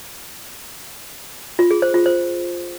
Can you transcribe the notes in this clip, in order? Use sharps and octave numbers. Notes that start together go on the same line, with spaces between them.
F4
G#4
C5
F4
C5